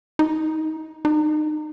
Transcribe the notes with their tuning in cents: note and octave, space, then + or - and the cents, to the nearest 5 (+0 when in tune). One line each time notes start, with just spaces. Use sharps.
D#4 +20
D#4 -30